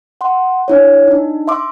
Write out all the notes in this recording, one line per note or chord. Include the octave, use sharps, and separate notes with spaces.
F#5 C6
D4 E4 C#5
D4 D#4
E5 C6 D6 E6